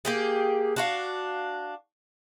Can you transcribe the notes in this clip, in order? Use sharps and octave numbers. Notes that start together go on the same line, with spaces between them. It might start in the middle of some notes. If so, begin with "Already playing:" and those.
A#3 G4 G#4
D4 F#4 F5